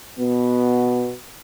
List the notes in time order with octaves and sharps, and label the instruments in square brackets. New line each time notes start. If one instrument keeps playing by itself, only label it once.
[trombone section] B2 B3